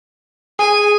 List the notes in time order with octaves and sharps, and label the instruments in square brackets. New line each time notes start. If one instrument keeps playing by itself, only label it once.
[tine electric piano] G#4 [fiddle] G#5